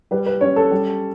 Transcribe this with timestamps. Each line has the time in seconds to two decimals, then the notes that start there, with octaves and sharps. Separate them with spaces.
0.11 G3 B4
0.26 B4
0.41 C#4 C#5
0.56 A4
0.71 G3